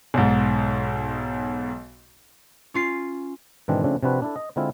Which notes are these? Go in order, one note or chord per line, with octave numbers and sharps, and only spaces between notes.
B1 G#2
C#4 F4 C7
G#2 B2 D#3 E3 C4 D4
C#3 F3 A3 C4 D4
C3 F3 C4 D4 F#4 B4
D4 E4 A4
D#5
D3 G#3 C4 E4 F4